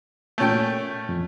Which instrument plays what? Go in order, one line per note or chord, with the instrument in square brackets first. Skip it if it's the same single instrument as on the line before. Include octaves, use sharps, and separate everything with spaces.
[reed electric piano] A#2 G6 [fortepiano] A3 C#4 G5
[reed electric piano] F2